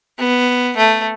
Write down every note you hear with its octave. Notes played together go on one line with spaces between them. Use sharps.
B3
A3